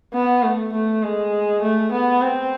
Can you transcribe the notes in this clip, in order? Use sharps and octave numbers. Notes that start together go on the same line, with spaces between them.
B3
A3
A3
G#3
A3
B3
C4